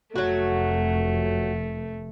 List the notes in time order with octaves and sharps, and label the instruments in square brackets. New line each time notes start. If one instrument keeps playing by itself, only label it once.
[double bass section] F1 [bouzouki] F#3 F#4 [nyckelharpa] A3